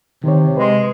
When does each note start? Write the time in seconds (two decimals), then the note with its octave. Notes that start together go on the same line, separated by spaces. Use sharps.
0.24 C3 D#3 C#5
0.57 G#3 B4 C6